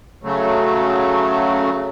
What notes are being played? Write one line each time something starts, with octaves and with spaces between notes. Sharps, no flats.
C#3 F#3 A3